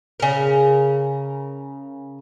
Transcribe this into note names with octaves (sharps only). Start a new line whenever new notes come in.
C#3 A#4